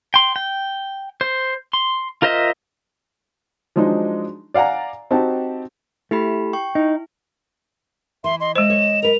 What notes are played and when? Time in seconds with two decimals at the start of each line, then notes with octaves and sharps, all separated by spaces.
0.14 G5 C6
0.36 G5
1.21 C5
1.73 C6
2.22 F4 A#4 C5 D#5 E5
3.76 F3 F#3 G#3 D4 D#4
4.54 D5 F5 F#5 G#5 A#5
5.11 C4 D#4 F#4 G4 A5
6.11 A3 E4 G4 B5
6.53 G5 C#6
6.75 D#4 E4
8.24 E3 E5 C6
8.40 D#5 C6
8.56 G#3 C5 D#5 E7
8.70 C#5
9.03 A#4 B4 F7